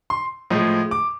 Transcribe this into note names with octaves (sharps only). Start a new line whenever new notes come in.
C6
A2 F3 G#3
D6